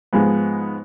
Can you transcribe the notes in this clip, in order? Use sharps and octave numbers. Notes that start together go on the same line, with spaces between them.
G#2 F3 G#3 B3